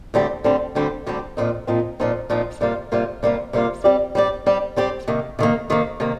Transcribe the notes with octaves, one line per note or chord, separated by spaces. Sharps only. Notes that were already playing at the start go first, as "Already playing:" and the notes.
D2 D3 G3 C4 G4
D2 D3 G3 C4 G4
D2 D3 G3 C4 G4
D2 D3 G3 C4 G4
A#2 F3 C4 D#4
A#2 F3 C4 D#4
A#2 F3 C4 D#4
A#2 F3 C4 D#4
C3 G3 A#3 F4
C3 G3 A#3 F4
C3 G3 A#3 F4
C3 G3 A#3 F4
G3 C4 G4 D5
G3 C4 G4 D5
G3 C4 G4 D5
G3 C4 G4 D5
C3 D#3 A#3
C3 D#3 A#3
C3 D#3 A#3
C3 D#3 A#3